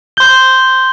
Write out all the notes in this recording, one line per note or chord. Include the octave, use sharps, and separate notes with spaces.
C6 G6 G7